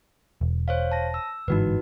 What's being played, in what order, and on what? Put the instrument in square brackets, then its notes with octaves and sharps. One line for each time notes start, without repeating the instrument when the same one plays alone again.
[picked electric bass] E1
[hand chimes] C5 C#5 F5
A5 A#6
E6
[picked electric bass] G1 G#2 E3 [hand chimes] D#4 F#4 B4